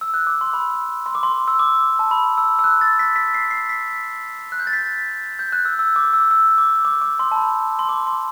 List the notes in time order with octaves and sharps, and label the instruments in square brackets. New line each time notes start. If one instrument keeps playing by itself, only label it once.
[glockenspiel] E6
F#6
D6
C6
B5
C6
D6
C6
E6
D6
A5
B5
E6
E6
F#6
A6
B6
B6
C7
C7
B6
F#6
G6
A6
B6
G6
F#6
E6
E6
D6
E6
E6
D6
D6
D6
C6
A5
B5
C6
D6
C6